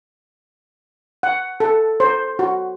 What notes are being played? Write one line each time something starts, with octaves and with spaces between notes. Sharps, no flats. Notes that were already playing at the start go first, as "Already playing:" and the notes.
F#5
A4
C5
F#4